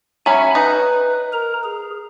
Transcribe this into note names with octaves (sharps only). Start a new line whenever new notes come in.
F#3 C#4 E5 G#5 B5
D#4 B4
A#4 A#5
G#4